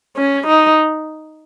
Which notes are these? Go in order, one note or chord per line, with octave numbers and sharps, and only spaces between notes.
C#4
D#4